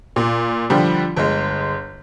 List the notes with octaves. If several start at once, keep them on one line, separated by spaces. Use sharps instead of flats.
A#2
D3 F3 G3
G1 G#3